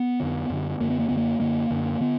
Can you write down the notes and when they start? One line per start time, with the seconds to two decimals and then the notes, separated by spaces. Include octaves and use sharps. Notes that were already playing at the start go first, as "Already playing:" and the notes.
Already playing: B3
0.20 F2 D3
0.50 F#2 D3
0.80 F#2 D3 A#3
0.90 B3
0.99 A#3
1.08 F#2 D3 B3
1.17 A#3
1.40 F#2 D3 A#3
1.70 F#2 D3
2.00 D3 B3